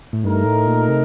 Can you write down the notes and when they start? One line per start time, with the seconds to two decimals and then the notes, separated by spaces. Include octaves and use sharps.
0.13 A2
0.23 G2 A3 D#4 A#4
0.45 A2
0.67 A#2
0.89 C3